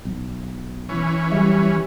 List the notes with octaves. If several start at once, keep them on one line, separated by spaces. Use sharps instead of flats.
B1
E3 C#4
F#3 G3 G4 E5